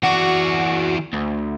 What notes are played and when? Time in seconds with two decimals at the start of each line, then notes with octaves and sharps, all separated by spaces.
0.04 E3 F#4 D5
1.13 D2